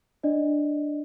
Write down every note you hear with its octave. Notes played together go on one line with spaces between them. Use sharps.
D4 D5 D#5